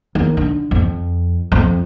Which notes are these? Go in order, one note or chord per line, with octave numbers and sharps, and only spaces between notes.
D#2
D3
F2
F2